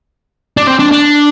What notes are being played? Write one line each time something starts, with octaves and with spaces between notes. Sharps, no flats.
D4
C4
D4
D4